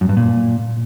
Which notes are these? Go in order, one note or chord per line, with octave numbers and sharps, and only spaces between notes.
F#2
G2
A#2